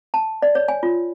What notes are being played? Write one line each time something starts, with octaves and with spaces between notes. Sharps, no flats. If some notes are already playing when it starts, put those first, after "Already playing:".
A5
D5
C#5
G#5
F4